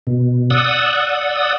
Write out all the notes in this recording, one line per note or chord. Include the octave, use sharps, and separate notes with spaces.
B2
D5 F#5 D#6 E6